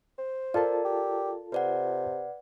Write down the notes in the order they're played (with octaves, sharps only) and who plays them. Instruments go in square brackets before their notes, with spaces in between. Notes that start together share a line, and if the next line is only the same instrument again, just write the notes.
[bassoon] C5
[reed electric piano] F4 A4 A5 [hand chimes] A#4 D5
[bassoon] G4
[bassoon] C3 [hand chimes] B4 D5 F#5